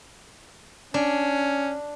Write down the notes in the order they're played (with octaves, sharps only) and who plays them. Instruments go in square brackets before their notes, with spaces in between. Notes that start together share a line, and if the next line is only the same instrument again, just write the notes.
[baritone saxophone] C#4 [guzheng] D4